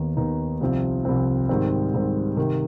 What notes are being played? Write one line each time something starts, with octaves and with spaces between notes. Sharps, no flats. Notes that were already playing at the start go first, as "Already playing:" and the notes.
Already playing: D#2 D#3 B3 D#4
D#2 D#3 B3 D#4
C2 C3 F3 C4
C2 C3 F3 C4
G#2 D#3 G3 C4
G#2 D#3 G3 C4
C3 D#3